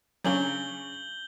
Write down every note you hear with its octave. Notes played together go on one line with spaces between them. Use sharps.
C#3 F#3 C#4 D4 G6 F#7 G7